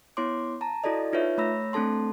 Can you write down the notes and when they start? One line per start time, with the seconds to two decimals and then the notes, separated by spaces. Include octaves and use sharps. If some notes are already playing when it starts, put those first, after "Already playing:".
0.17 B3 E4 C#5 C6 D6
0.61 A5 A#5
0.84 E4 F#4 A4 D5 D#5
1.13 D#4 F4 B4 C#5 E5
1.38 A3 C#5 B5 E6 A#6
1.73 A3 C4 D4 A4 A5 C6